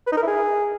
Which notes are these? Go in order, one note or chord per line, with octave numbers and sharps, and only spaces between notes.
B4
D#4
A#4
E4
G#4